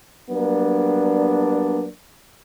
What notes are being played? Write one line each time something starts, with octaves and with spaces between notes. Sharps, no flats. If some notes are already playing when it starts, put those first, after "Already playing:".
F#3 G3 A#3 B3 D4